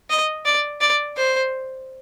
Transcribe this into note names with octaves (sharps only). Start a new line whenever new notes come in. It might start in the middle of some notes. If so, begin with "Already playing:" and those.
D#5
D5
D5
C5